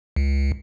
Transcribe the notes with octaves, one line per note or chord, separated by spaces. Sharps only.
C#2